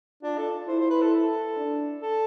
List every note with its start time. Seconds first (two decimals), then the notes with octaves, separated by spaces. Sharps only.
0.23 D4 F4
0.38 A4
0.68 E4 C5
0.79 C5
0.90 B4
1.02 A4
1.13 A4
1.57 D4
2.02 A4